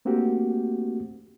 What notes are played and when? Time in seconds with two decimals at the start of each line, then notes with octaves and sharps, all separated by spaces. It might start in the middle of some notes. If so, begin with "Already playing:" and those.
0.05 A3 A#3 C4 D4 F#4 G4